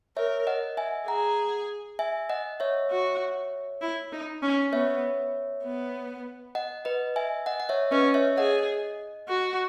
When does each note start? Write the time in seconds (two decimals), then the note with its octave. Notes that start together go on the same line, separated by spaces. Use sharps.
0.17 A#4 C#5 E5
0.47 D#5 F#5
0.77 E5 G#5
1.08 G#4 F#5 A#5
1.99 E5 G#5
2.30 D#5 F#5
2.60 C#5 E5
2.90 F#4
3.81 E4
4.12 D#4
4.42 C#4
4.73 B3 C#5 E5
5.64 B3
6.55 D#5 F#5
6.85 B4 D#5
7.16 E5 G#5
7.46 D#5 F#5
7.60 F#5
7.69 C#5 E5
7.92 C#4 B4 D#5
8.14 C#5 E5
8.38 G#4 D#5 F#5
9.29 F#4